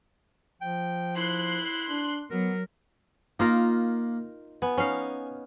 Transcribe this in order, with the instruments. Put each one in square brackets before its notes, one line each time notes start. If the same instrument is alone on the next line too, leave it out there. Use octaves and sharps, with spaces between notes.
[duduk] F3 [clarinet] G5
[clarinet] E4 [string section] C6 F#6
[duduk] D4
[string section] F#3 [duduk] B3 [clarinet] A#4
[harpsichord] A#3 [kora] D#4 F4 A#4
[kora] B3 [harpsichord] G#5
[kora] C#4 D#4 F5